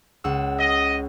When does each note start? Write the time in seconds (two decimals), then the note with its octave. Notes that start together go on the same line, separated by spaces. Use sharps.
0.24 C#2 F#5 E6
0.59 D#5